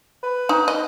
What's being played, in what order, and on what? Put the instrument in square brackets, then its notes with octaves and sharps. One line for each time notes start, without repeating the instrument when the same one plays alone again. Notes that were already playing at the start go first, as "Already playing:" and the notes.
[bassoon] B4
[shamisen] D#4
D#5